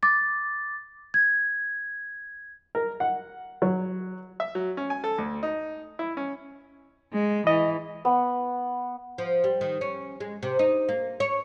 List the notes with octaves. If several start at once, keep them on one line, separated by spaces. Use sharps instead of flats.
D6 A6
G#6
A#4
F#5
F#3
E5
F#3
C#4
G#5
A4
D2
D#4
E4
C#4
G#3
E3 D#5
B3
F3
G3
D#3
C#4
G#3
C3
D#4
A#3
C#5